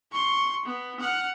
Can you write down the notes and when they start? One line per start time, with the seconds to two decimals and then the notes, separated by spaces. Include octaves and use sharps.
0.11 C6 C#6
0.65 B3
1.00 F#5 F6